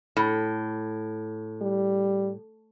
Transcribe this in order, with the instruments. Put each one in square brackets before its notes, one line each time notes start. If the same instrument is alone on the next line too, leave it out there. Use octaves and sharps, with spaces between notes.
[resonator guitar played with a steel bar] A2
[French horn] G3